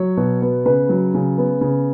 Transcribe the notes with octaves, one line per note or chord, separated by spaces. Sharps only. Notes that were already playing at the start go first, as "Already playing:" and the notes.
Already playing: F#3 C#5
B2
B3
C#3 B4
F#3
C#3
B3
C#3